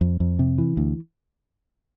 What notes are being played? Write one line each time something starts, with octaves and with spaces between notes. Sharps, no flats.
F2
F2
C3
E3
D2